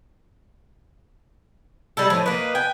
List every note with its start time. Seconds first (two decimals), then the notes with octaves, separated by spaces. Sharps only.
1.97 G3 G#3 A4
2.10 A2 F3 G#5
2.26 A#3 D#4 B4
2.55 G5 G#5